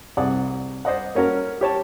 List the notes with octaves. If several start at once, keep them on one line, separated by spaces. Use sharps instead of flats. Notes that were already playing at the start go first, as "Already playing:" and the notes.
C2 G#4 D5 F#5
C5 D5 D#5 F#5
A#3 C#4 F#4 A#4
G4 C#5 A5